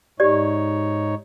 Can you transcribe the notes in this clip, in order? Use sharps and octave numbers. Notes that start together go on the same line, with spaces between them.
G#2 D#4 G4 C#5 D5